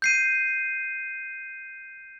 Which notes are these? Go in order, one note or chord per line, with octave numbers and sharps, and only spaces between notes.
G6 C7 D#7